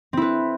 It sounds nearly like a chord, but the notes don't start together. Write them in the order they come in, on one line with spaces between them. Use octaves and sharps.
C4 E4 B4